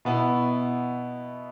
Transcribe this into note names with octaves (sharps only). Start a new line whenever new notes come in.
B2 B3 E4